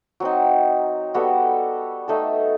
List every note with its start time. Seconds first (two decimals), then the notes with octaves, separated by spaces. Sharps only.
0.20 F#3 C4 D#4
1.14 G3 B3 F#4 A4
2.08 A3 D#4 A4